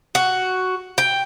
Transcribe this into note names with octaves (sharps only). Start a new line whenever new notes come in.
F#4
G5